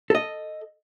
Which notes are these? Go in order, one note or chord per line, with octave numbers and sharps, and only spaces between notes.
A4 D#5